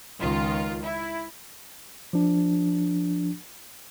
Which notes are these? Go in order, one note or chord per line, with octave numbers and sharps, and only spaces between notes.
C#2 D#3 F4
E4
F3 D4